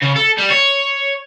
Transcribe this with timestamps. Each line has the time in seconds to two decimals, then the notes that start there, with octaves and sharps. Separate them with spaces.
0.02 C#3
0.16 A4
0.38 G3
0.50 C#5